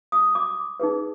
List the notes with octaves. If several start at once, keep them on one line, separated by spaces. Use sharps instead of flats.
D#6
D6
D#4 G#4 B4